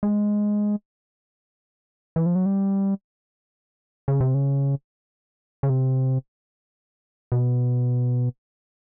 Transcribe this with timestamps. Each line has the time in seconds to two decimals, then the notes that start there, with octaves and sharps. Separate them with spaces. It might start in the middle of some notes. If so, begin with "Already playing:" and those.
0.03 G#3
2.16 E3
2.26 F3
2.35 F#3
2.46 G3
4.08 C#3
4.21 C3
4.34 C#3
5.63 C#3
5.70 C3
7.32 B2